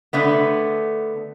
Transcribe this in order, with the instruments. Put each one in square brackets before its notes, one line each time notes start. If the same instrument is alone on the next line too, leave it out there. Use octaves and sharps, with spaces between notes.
[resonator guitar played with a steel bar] D3 A3 B3